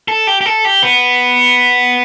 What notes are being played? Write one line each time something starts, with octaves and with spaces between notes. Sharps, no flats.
A4
G4
G4
A4
G4
B3